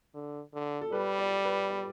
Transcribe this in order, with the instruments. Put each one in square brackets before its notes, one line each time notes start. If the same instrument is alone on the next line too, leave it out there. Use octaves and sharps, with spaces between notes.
[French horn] D3
D3
[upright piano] A4
[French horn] G3 [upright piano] B4
[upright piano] D5
B4
D5